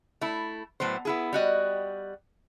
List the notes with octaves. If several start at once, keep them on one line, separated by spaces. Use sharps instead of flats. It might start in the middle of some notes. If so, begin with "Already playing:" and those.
A3 E4
A2 F#3 B3 C5
B3 E4 G#4
G3 F#4 D#5